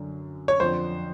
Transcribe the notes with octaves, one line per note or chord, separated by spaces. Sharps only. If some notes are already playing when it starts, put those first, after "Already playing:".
Already playing: F#2 D3
C#5
F2 D3 C5